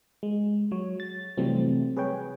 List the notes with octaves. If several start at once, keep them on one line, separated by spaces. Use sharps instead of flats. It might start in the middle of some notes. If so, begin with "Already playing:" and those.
G#3
F#3 C#5
A6
C3 E3 F#3 G3 A3 C4
G#4 B4 C#5 G5